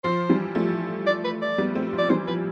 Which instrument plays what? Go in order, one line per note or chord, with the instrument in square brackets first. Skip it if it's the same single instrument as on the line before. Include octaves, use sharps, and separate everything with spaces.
[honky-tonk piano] F3 [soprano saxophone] C5
[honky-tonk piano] E3 G3
F3 A3
[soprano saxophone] D5
B4
D5
[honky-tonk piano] G3 B3
A3 C4
[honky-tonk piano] F3 [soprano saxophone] D5
[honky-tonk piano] E3 G3 [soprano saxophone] C5
[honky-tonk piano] F3 [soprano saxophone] B4